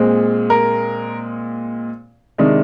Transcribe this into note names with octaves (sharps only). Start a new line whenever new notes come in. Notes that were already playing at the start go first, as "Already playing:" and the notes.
Already playing: A#2 G#3 C4 G#4
A#4
C3 D#3 G#3 D4